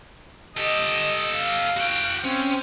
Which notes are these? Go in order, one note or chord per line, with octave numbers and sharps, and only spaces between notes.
G4 A4 D#5
F5
F#4 G5
C4 C#4